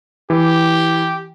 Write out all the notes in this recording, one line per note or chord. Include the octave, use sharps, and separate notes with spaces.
E3 G4